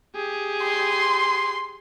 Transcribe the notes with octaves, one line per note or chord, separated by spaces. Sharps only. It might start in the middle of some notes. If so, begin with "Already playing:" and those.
G4 G#4
C6